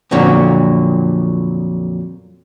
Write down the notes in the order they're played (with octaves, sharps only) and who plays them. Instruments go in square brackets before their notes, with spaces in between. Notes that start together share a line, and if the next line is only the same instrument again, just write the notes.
[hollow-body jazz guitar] F2 A#2 D3 F#3 C#4